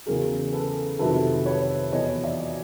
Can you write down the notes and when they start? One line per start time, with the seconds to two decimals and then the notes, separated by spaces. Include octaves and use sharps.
0.06 E2 C#3 F#3 G#4 A#4
0.53 A4 B4
0.99 F2 C3 D#3 F#3 A4 B4
1.46 B4 C#5
1.92 E2 B2 F#3 C#5 D#5
2.24 D5 E5